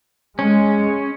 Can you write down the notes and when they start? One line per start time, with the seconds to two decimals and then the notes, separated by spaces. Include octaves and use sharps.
0.39 G#3 C#4